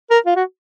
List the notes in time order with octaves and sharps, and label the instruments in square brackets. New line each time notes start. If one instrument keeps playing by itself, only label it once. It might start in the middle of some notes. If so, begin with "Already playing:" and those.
[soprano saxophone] A#4
F4
F#4